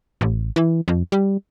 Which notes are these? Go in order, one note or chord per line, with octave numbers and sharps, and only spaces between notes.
A1
E3
F2
G3